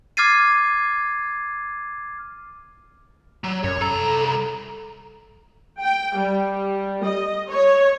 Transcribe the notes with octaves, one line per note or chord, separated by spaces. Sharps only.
D6 F6 G#6 A6 C7 D#7
F#3
F#2 C#5
C2 A4 A#5
G5
G3
D#5
C#5